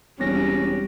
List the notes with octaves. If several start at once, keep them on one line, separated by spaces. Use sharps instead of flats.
E1 G3 C4 C#4 A#6